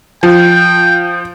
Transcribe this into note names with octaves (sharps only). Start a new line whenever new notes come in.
F3 G5